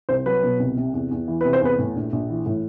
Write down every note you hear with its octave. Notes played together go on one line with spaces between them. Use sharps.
C2 C5
F#3 B4
B2
C2
C3
E2
E2
E3
B4
C3
C5
E2 B4
A2
A#1
A#1
E3
A2